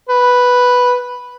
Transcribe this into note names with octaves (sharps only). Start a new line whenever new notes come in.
B4